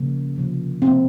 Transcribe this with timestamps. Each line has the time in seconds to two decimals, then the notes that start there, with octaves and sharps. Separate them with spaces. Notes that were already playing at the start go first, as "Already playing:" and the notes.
Already playing: C#3 F3 A#3
0.36 C3 F3 A#3
0.82 C3 F3 A#3 C4